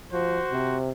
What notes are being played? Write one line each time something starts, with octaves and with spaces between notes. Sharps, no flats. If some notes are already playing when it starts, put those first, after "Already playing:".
F3 F#4 C5
C3